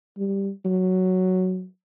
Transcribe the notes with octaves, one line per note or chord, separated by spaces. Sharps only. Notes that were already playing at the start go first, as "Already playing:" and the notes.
G3
F#3